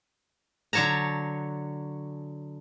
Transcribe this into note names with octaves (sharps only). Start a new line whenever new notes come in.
D3 F#3 C#5 A5 A#5